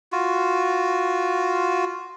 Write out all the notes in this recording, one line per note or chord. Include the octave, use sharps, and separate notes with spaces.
F4 F#4